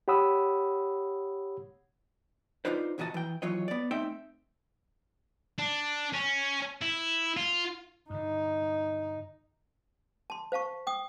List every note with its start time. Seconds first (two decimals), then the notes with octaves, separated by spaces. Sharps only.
0.08 G4 C#5 F#5 B5 D#6 E6
2.65 D4 D#4 F4 B4 C5
2.98 D2 A#2 E3 F#4 D#5 A5
3.14 E3 G5
3.42 D#2 E3 F#3 F4 C#5 D#5
3.68 B3 D5
3.91 A3 C4 D#4 E5 G5
5.58 D4
6.13 C#4
6.82 E4
7.37 F4
8.10 G2 D3 D#4
10.30 A5 C6
10.52 C5 F5 A5 C#6
10.87 G5 D#6